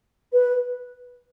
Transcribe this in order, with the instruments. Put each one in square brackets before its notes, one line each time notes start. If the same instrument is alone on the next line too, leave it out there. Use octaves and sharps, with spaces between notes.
[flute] B4